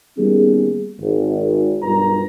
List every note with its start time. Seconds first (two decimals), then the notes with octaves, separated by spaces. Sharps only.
0.18 D#3 G3 A#3 B3 C#4 G#4
1.00 G#1
1.83 B1 G2 F4 A#4 B4 A#5